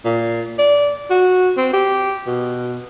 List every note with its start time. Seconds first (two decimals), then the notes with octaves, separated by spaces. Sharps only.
0.05 A#2
0.59 D5
1.10 F#4
1.57 C4
1.73 G4
2.27 B2